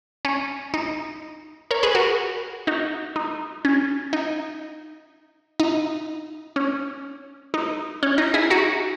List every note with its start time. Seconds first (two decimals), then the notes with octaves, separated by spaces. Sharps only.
0.25 C#4
0.74 D#4
1.71 A#4 C#5
1.83 G#4 B4
1.95 F#4 A#4
2.67 D#4 F#4
3.16 D#4
3.65 C#4
4.13 D#4
5.60 D#4
6.56 C#4
7.54 D#4
8.03 C#4
8.18 D#4
8.34 E4 G#4
8.50 D#4 F#4